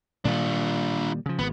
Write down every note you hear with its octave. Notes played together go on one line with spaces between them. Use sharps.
A#2 D#3 G3 D4 F4
C#3 F3
G#1 B3